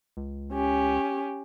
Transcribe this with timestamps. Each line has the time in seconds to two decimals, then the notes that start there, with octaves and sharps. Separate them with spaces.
0.17 C#2
0.53 C#4 G4